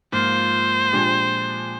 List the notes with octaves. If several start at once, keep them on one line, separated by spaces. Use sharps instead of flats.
G#2 F3 A#3 F4 C5
A#2 F3 G#3 D4 G4